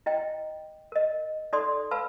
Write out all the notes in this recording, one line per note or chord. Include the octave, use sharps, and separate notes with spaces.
E4 D#5 G5
A#4 D#5
D#4 A4 D5 C6 D#6
B4 F5 A5 B5 E6